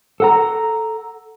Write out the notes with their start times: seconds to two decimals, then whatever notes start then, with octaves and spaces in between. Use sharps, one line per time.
0.20 A4 F#5 A#5